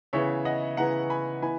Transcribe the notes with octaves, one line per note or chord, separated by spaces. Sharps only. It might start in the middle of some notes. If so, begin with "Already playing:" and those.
C#3 E3 B3 C#5 E5
D#5 F#5
C#3 E3 B3 F#5 A#5
G#5 B5
E3 B3 G#5 B5